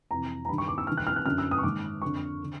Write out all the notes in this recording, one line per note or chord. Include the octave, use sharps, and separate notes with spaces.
F2 C3 E3 A#5
A#5
G2 D#3 B5
C#6
D6
E6
G2 D#3 F6
F#6
F6
F#6
F#2 D3 F6
E6
D#6
C#6
G#2 D#3 D6
F2 D3 C#6
D3